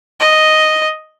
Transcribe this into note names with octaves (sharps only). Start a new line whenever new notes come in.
D#5